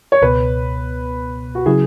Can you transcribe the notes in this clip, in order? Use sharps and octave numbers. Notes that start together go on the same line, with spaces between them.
C#5
C#2 B2 B3 B4
F#4
C#3 F#3 E4 G#4